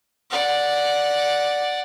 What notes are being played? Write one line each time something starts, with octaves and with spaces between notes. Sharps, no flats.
D5 F#5